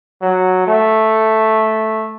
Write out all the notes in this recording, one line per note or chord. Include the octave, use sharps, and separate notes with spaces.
F#3
A3